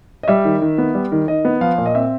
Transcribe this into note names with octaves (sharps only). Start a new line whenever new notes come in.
D#5
G3 E5
D#3
D#3
B3
G3
D#3
D#3 D#5
B3
F3 F5
A#2
D#5
C4 E5